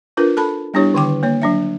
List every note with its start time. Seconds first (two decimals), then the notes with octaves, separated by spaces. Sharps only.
0.17 D4 F4 A#4 B4
0.37 A4 A5 B5
0.74 G3 B3 D4 E4 G4 C#5
0.94 D3 D#3 G5 D6
1.23 A#3 C#5
1.42 F#3 D4 E5